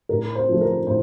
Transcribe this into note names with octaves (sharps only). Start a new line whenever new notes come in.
A2 A#4
C5
F3 A3
A#4
A2 C5